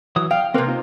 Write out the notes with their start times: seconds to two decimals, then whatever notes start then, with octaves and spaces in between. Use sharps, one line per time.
0.16 E3 F#3 D#6
0.31 F5 G5
0.54 C3 A#3 C4 A#4 B4
0.67 D#4 F4 C5